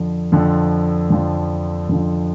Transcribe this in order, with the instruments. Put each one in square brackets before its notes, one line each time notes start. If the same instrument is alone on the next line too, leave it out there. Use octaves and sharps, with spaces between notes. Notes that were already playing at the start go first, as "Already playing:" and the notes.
Already playing: [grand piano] F2 D3 F3
F2 D3 F3
F2 D3 F3
F2 D3 F3